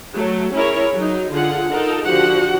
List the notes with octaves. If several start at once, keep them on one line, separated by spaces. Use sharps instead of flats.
F#3 A3
C#4 E4 G#4 A#4 C#5
F#3 D#4
D3 F4 G#4 F#5
D#4 F4 A4 A#4
D3 F3 F#4 G4 F#5